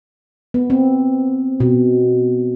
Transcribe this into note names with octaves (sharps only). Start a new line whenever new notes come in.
B3
C4
B2